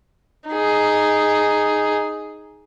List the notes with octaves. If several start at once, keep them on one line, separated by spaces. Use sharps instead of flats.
D#4 G#4